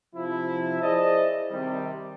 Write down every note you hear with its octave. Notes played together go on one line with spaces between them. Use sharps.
C3 F3 E4
E4 G#4 C5 D5 D#5 A5
C3 D#3 G3